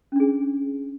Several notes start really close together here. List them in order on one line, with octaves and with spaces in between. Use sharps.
C#4 D4 G#4